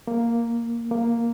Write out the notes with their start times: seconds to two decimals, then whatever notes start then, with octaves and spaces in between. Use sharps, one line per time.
0.07 A#3
0.91 A#3